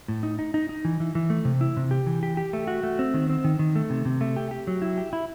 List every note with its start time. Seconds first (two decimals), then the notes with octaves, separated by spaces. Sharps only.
0.08 A2
0.23 D#4
0.39 D#4
0.54 D#4
0.69 D#4
0.85 E3
1.00 E3
1.15 E3
1.30 A3
1.45 C3
1.61 E4
1.77 C3
1.91 G4
2.07 E3
2.23 G4
2.37 G4
2.53 A3
2.67 F#4
2.83 A3
2.99 C4
3.14 D#3
3.30 C4
3.45 D#3
3.59 D#3
3.76 A3
3.90 C3
4.05 C3
4.21 A3
4.36 G4
4.51 G4
4.67 F#3
4.82 E4
4.98 G4
5.13 E4